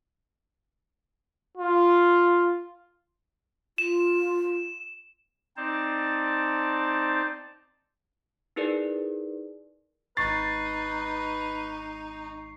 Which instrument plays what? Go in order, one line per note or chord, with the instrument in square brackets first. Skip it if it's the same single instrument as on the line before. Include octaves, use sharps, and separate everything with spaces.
[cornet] F4
[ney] F4 [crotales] E7
[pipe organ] C4 D#4 C5 D5 A5
[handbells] D#4 E4 G#4 A#4 B4 D5
[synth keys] G#1 C#6 C7 [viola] D#4 [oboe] B4 [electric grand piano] A6